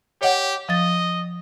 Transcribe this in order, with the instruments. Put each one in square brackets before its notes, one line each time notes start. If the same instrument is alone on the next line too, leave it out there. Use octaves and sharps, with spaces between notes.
[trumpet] G4 [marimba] C#5 D#5 F#5
[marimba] F3 A6 [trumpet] D#5